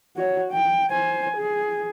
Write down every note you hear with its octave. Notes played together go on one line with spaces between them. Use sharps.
F#4 C#5
G5
C5 G#5
G#4